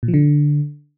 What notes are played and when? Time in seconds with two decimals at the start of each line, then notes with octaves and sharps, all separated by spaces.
0.03 A#2
0.08 F3
0.14 D3